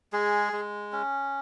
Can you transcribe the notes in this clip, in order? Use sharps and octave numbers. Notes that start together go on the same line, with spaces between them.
G#3 G#4
G#3
C#4